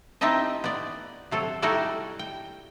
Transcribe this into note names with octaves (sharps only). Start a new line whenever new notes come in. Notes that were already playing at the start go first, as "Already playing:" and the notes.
C4 D#4 E4 G4 D#5 A5
B3 D5
C3 F#3 A4
G3 D#4 E4 F#4 A4 D5
G5